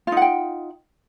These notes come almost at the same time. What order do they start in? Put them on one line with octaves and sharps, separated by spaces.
F4 D#4 F#5 G5